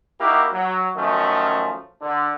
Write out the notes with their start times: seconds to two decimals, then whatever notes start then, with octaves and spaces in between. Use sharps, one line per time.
0.20 A#3 D#4 E4 F#4 G4
0.52 F#3
0.96 D#3 F3 F#3 A3 C#4
2.02 D3